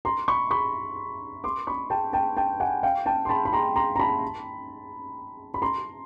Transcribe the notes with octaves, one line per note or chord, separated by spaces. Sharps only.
A#5 C6
B5 C#6
B5 C#6
C6 D6
B5 C#6
G5 A5
G5 A5
G5 A5
F#5 G#5
F5 G5
G5 A5
C6
A5 B5
B5
A#5 C6
A#5 C6
A#5
A5 B5
B5
A#5 C6